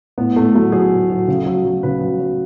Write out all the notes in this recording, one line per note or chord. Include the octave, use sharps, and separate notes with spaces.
A2 B3
A2 A3
F#3 A3
F#3 G#4
A2
F#3
C#3
F#3
F#3
C#3 B4
F#3
F#3